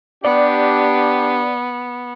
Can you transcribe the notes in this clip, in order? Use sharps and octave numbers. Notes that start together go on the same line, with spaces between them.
B3 D4 G4 D5